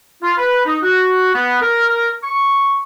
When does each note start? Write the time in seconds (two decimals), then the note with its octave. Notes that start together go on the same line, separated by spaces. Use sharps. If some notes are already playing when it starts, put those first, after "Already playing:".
0.22 F4
0.37 B4
0.66 D#4
0.82 F#4
1.34 B3
1.61 A#4
2.24 C#6